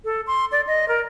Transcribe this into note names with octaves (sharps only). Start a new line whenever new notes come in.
A4
C6
D5
D#5
A#4